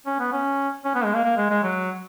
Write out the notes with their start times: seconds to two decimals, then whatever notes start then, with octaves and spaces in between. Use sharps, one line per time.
0.06 C#4
0.20 B3
0.32 C#4
0.84 C#4
0.95 B3
1.04 G#3
1.14 A#3
1.24 A#3
1.37 G#3
1.50 G#3
1.63 F#3